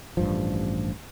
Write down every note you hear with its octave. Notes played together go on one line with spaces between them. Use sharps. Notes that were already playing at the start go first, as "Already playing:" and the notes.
A1 G2 F3